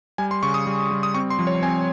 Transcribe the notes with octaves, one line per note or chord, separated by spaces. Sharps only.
G3 G#5
C6
C#3 C#6
D#6
G3
G3
D#6
C4 C#6
C6
F3
C#5
C4 G#5